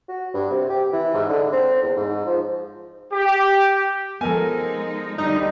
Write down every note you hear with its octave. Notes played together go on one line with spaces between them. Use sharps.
F#4
G2
C3
G4
E3
G#2
D3
C4
E2
G#2
F3
G4
F3 G#3 B3 D#4 A4 A#4 G#5
D2 D3 G3 D#4